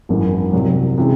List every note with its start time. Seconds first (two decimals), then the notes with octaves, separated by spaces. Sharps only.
0.09 G#1 F#2 E3
0.53 C2 C3 F#3
0.98 C3 E3 G#3 C#4